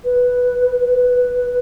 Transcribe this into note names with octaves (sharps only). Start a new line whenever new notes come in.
B4
B4